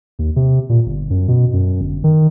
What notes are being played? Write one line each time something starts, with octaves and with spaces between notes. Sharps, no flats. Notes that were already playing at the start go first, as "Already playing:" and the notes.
D#2
C3
A#2
G1
F#2
B2
F#2
G1
D#3